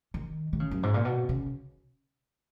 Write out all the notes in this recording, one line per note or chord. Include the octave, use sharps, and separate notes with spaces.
D#3
D#3
C#3
F#2
G#2
A#2
B2
C#3